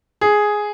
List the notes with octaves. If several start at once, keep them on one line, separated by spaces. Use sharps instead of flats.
G#4